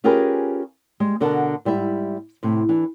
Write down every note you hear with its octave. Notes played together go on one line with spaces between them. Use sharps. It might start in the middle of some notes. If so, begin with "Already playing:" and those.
C#4 F4 G4 G#4 A#4 B4
G3 G#3
B2 D3 A#4 F#5 A5
G#2 G3 E4 E5
A2 C3
E3 D4